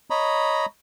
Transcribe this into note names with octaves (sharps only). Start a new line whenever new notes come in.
C#5 D#5 A#5 B5